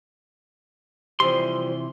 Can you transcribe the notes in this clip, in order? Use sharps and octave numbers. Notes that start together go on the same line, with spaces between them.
C3 E3 F3 G3 C6